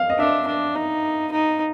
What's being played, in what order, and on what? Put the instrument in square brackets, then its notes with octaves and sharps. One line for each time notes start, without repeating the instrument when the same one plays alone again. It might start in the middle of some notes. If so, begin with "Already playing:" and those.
Already playing: [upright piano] F5
D#5
[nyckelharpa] D4 [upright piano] E5
[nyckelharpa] D4
D#4
D#4